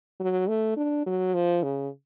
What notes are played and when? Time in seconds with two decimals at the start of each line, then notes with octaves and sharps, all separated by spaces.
0.20 F#3
0.48 A3
0.77 D4
1.06 F#3
1.34 F3
1.63 C#3